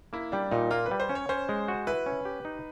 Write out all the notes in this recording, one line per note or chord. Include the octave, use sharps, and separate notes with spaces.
A#3 E4
G3 D4
A#2 D#4
A#3 F4
B4
G3
C5
C#4
C#5
C#4 C5
G#3
F#4
E4 B4
C#4
G4
D#4